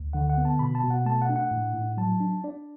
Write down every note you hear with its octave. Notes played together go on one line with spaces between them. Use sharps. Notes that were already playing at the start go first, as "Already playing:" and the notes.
Already playing: D2
D3 F#5
F#5
B3
A5
B2 B5
A5
B2
F#5
A3 A5
F#5
D4
F#5
A2
A2
F#3 A5
D4
D4 D5